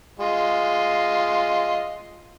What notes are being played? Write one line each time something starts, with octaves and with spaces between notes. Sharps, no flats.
G#3 F4 D#5